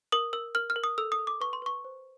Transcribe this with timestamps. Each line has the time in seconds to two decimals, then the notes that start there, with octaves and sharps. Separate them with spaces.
0.12 A#4 D#6
0.33 A#4 E6
0.55 A#4 F6
0.70 F6
0.76 A#4
0.84 D#6
0.98 A4 E6
1.12 D#6
1.19 A4
1.27 D6
1.41 B4 C#6
1.53 C6
1.62 B4 C#6
1.85 C5